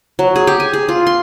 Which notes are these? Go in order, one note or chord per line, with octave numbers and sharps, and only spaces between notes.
F#3
G#4
G4
G#5
G#4
F4
C6